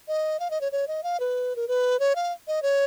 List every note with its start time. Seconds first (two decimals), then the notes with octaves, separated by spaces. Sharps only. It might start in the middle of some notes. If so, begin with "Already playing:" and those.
0.08 D#5
0.40 F5
0.51 D#5
0.61 C#5
0.72 C#5
0.88 D#5
1.03 F5
1.20 B4
1.56 A#4
1.68 B4
2.00 C#5
2.16 F5
2.48 D#5
2.63 C#5